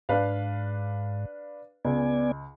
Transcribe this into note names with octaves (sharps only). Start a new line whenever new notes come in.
G#2 D4 B4 F5
C#2 B3 D5 G#5